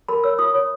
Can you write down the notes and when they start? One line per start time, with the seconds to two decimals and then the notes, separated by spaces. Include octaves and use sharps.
0.09 A#4 B5
0.24 C#5 E6
0.39 F4 D#6
0.54 C#5